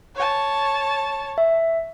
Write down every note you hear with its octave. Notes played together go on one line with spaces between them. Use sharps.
C#5 A5
E5